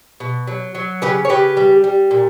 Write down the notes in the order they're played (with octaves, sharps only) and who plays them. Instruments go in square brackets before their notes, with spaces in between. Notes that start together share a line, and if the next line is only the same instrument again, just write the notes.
[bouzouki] B2
F#3
F#3
C#3 G4 B4
C#5
C#3 G4 B4
G3
G3
A#2